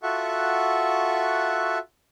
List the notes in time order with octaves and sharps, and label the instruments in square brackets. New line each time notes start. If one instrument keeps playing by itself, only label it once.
[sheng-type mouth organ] F4 F#4 A4 E5 F#5 C#6